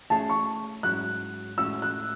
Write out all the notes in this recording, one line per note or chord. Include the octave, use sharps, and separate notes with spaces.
A3 C#4 G#4 C#5 E5 A5
C#6
G#2 F#3 C#4 E4 F#6
A2 G#3 C#4 F#4 E6
F#6